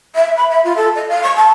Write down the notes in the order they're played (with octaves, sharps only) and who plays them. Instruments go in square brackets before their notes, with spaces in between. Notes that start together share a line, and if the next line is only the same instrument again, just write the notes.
[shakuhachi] E5
B5
E5
F4
A4
D#5
F5
C#6
A5